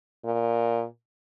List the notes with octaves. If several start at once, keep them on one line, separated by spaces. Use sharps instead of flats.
A#2